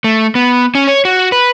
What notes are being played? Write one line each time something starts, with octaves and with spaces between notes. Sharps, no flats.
A3
B3
C#4
C#5
F#4
B4